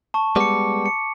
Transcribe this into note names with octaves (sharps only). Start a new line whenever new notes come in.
A5 C#6
G3 G#3 B3 D6 C#7
C#7